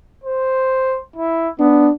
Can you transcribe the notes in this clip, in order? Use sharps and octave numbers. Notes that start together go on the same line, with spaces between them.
C5
E4
B3 D4